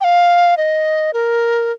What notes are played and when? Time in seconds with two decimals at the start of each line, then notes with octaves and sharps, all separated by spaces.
0.01 G5
0.04 F5
0.57 D#5
1.13 A#4